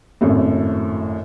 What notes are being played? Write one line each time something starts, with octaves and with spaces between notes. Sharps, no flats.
G#1 F#2 A2